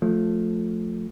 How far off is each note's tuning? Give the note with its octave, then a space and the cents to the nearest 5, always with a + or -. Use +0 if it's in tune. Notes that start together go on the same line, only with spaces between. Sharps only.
F3 +20 A3 +0